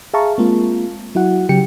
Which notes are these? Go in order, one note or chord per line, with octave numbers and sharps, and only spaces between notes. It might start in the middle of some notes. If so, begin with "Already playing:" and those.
G#4 E5 F5 A5 A#5 C#6
G#3 A#3 C4 F4
F#3 E4 F#4 F#5
C#3 F#3 G4 G5 C#7